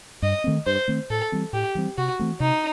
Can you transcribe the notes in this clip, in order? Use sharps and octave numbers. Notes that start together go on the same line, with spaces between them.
G2 D#5
D#3 A3 C4
G2 C5
D#3 A3 C4
A2 A4
E3 G3 C4
A2 G4
E3 G3 C4
C3 F#4
E3 A3 C4
C3 D#4